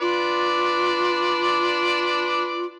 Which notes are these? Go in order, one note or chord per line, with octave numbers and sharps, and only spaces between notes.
D4 F4 B4 D5